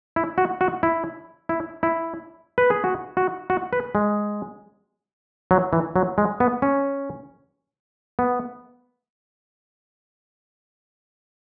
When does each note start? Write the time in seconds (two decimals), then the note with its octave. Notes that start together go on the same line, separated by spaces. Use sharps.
0.16 E4
0.38 F#4
0.61 F#4
0.83 E4
1.49 E4
1.83 E4
2.58 B4
2.70 G#4
2.84 F#4
3.17 F#4
3.50 F#4
3.73 B4
3.95 G#3
5.51 F#3
5.73 E3
5.96 F#3
6.18 G#3
6.40 B3
6.62 C#4
8.19 B3